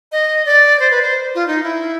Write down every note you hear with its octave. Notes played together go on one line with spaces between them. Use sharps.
D#5
D5
C5
B4
C5
F4
D#4
E4